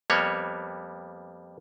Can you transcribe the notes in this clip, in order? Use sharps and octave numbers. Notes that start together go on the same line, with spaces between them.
F2 G3 A#3 B3 C#5